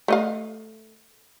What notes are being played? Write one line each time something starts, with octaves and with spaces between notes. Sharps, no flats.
A3 D#5 F5